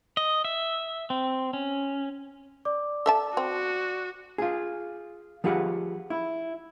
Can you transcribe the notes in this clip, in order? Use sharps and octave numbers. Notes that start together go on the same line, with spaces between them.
D#5
E5
C4
C#4
D5 D6
A4 E5 A5
C4 F#4
F4 G#4
F3 G4 G#4 B4 F#5
E4